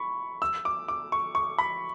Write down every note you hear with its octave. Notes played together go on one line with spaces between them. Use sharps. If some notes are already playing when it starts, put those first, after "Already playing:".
Already playing: B5 C#6
E6
D6
D6
C#6
C#6
B5